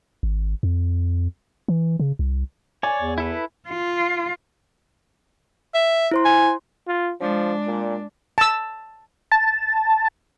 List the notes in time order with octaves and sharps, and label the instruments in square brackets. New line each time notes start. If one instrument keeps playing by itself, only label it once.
[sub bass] G#1
F2
E3
C#3
C2
[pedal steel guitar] C#5 D5 [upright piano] G#5
[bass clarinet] E2
[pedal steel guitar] E4 A4 B4
[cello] F4
[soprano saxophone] E5
[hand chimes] E4 C5 C6
[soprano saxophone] G#5
[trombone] F4
[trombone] F3 [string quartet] G#3 D4
[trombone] A#2
[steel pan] A5 E6
[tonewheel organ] A5